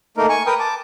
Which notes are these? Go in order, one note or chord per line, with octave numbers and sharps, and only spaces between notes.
A3 A#3 D#4 A#4
G#5 C#6
A#4 B4 G5 D#6
A5 D6